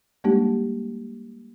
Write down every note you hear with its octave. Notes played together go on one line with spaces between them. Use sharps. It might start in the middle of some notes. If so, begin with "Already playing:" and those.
G3 G#3 A#3 D4 D#4 G4